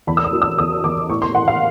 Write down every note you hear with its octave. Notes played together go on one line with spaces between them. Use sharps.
E2 B5
E6
D#6
F#3
E6
E2 D#6
E2 D6
A2 C#6
C6
A2 F#5
F5